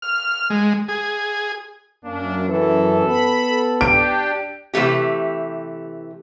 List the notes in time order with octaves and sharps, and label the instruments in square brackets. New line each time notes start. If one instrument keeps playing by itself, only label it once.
[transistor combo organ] F6
G#3
G#4
[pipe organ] F#2 [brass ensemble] A#3 C#4 D4
[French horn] E3 [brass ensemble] A4
[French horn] B3 [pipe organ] B5
[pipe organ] D4 G4 [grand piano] D7
[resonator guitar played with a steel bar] C3 E3 G#3 A3 G4